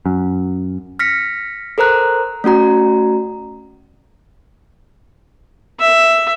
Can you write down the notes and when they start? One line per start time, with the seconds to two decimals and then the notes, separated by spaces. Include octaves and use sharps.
0.06 F#2
0.99 F6 A#6 B6 C#7
1.78 A4 A#4 C5 A#5 F#6
2.44 A3 C#4 F#4 A#5
5.80 E5